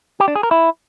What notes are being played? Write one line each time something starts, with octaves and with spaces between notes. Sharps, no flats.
G4
D4
G#4
A#4
E4